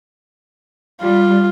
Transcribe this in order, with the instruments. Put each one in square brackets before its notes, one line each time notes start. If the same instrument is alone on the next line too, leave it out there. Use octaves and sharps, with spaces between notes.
[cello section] G3 [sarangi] F4